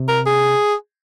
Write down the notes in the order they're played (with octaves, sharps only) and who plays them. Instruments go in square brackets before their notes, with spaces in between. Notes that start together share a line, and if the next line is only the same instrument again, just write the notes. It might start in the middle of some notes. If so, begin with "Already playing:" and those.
Already playing: [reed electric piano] C3
[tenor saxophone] A#4
G#4